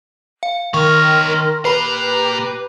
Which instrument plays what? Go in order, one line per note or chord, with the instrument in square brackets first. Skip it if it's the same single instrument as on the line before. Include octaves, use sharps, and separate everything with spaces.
[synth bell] F5
[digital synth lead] D#3 [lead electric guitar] D#4 C#5 [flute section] A#4 C6 [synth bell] C#6
[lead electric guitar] A#2 A#4 [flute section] G4 D6 [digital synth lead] B4 [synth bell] B5 C7